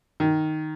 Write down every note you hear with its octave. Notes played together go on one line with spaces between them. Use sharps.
D#3